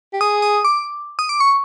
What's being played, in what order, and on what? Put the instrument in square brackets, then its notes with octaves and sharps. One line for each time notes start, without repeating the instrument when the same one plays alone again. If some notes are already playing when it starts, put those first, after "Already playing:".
[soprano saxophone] G4
[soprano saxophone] G#4 [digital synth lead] D#6
[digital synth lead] D#6
D6
D#6
D6
C#6